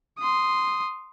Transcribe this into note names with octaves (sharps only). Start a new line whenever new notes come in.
C6 D#6